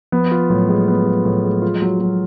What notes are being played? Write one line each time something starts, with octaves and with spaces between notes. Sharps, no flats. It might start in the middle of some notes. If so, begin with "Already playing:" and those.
F3 B3
F4
A2 F#3
G#3
B3
F4
A2
G#3
F4
F#3
F#3